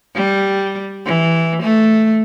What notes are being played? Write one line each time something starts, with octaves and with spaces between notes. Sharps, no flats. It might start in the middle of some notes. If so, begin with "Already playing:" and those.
G3
E3
A3